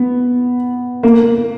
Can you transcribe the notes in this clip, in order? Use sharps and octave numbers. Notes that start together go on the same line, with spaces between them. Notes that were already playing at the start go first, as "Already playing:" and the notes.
Already playing: B3
A#3